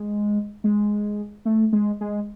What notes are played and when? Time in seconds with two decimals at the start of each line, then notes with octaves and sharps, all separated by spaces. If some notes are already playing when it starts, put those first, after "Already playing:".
Already playing: G#3
0.64 G#3
1.45 A3
1.73 G#3
2.01 G#3